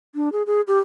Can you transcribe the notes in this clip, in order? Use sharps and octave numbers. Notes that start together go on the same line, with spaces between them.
D4
G#4
G#4
G4